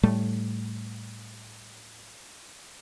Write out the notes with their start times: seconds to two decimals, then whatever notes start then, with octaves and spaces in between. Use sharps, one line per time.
0.03 A2 G3 A3